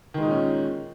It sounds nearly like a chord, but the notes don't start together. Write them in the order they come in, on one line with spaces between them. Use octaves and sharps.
D#3 G#3 D#4 A#2 C#4